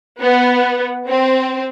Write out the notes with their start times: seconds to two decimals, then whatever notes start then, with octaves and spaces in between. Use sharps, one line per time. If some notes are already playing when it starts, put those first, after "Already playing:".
0.19 B3
1.08 C4